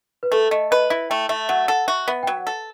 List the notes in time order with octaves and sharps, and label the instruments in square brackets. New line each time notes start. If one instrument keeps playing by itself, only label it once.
[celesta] B4
[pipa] A3 [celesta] A4
[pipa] A3 [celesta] D#5
[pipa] B4 [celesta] D#5
[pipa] E4 [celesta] E5
[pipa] A3 [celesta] G5
[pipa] A3 [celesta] E5
[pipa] F#3 [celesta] F#5
[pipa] A4 [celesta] F#5
[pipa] F#4 [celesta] E5
[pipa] B3 [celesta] E5
[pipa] F#3 [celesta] G5
[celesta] F#5
[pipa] A4